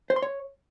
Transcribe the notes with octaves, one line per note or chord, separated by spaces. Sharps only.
C5
C6
C#5